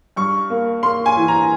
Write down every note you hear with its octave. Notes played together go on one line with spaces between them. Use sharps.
G2 C#6
A#3
A#3 C6
G#5
E3
A#5